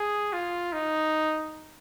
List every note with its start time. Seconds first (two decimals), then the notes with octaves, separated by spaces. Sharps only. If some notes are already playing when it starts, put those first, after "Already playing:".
Already playing: G#4
0.33 F4
0.73 D#4